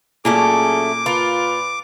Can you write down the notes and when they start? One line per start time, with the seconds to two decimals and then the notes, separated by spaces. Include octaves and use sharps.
0.25 A#2 F#3 A3 C#4 G#4 D6
1.06 F4 A#4 B4